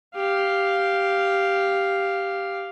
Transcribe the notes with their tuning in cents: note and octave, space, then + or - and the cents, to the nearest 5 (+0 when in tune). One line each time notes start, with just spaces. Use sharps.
G4 +0 F5 +0